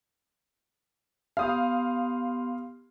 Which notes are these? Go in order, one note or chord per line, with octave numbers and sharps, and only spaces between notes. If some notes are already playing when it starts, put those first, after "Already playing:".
B3 G4 F5 C6 D#6